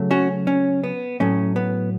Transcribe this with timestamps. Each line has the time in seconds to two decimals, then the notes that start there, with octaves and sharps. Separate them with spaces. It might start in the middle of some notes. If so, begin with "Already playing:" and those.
Already playing: C#3 F#3 A3
0.11 C#4 F#4
0.47 C#4
0.84 B3
1.20 A2 F#3 A3 C#4
1.56 B3